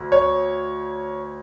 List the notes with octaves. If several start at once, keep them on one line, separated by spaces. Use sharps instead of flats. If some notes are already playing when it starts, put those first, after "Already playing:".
Already playing: D2
C#5